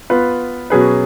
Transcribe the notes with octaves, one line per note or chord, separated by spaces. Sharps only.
B3 F4 B4
B2 F#3 C#4 G#4 B4